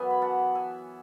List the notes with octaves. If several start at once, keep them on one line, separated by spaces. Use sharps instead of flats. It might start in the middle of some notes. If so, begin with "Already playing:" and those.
Already playing: F#2 E3 B3 E5 G#5
B5
F#5 A5
E5 G#5